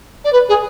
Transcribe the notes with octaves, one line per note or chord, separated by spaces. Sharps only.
D5
B4
G#4